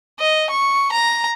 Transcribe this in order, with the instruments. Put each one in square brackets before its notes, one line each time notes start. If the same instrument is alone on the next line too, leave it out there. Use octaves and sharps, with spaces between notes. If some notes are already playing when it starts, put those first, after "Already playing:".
[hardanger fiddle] D#5
C#6
A#5